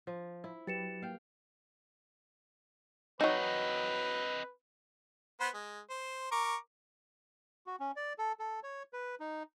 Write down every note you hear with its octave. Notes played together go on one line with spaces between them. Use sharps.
F3
E4
F#3 G4 B4 A6 C#7 E7
A#3 F5 G5
F#3 C4 D#4 B4 D#5
B3 B4 C5
G#3
C5
A#4 C#6 D6
F#4
C#4
D5
A4
A4
C#5
B4
D#4